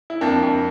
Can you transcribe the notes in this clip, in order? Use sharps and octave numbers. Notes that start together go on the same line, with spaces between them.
E4
F2 A#3 D4
F2